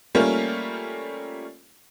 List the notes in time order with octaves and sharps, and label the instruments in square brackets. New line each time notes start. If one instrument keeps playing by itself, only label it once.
[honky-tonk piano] G3 A3 A#3 C#4 F4